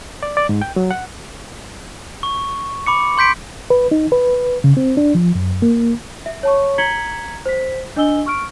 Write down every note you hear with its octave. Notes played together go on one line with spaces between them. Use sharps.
D5
D5
G#2
G5
F#3
F#5
C#6
B5 D6 C#7
C6 G6 B6 D7
B4
D#4
B4
C#3
C4
D4
F3
F#2
A#3
E5
C#5 A5 C#6
A#5 G#6 B6 C#7 F#7 G7
C5 B6
D4 D#5 G#5 E6 G7
C#6 F6 D7